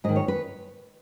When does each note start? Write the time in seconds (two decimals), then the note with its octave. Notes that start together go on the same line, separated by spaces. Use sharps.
0.04 G#2 D#3 D#5
0.16 C#5
0.28 B4